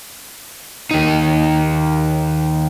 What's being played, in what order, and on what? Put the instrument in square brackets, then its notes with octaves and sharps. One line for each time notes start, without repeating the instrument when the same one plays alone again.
[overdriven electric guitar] D#2 D#4